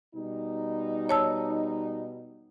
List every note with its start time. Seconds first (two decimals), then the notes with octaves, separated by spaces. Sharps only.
0.15 B2 G3 D#4
1.09 C#5 A5 E6